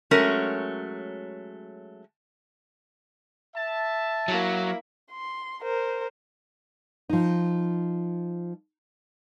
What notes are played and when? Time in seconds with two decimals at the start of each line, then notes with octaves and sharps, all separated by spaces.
0.11 F#3 G#3 A3 C#4 A#4
3.56 E5 A5
4.28 F#3 A#3 E4
5.12 C6
5.63 A#4 C5
7.09 F3 D#4